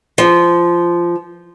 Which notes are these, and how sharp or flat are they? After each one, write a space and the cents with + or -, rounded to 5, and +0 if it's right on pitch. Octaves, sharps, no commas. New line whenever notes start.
F3 -15